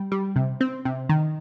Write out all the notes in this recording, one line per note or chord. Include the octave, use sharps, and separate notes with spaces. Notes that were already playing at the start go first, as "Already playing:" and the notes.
Already playing: G3
G3
C3
C4
C3
D#3